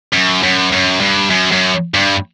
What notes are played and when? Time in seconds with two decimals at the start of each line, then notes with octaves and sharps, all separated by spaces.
0.13 F#2
0.43 F#2
0.72 F#2
1.01 G2
1.30 F#2
1.52 F#2
1.94 G2